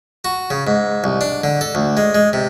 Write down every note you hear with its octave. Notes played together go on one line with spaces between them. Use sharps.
F#4
C#3
G#2
C2
D4
D3
A4
D2
G#3
G#3
C3